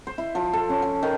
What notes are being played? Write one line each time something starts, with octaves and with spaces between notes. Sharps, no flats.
C5
E4
F3
A4
C#4
F3
D#3